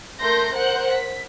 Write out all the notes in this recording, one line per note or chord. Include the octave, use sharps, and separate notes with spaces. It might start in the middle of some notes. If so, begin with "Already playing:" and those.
A3 A#4 C6 G6 A#6
A#4 C5 F#5 F#6 G6
B6